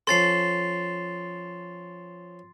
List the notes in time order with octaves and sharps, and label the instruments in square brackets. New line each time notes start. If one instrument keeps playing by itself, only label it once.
[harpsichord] F3 C#4 A4 [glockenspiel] C6 A6 C7